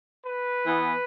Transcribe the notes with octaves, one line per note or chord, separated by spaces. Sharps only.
B4
E3 B3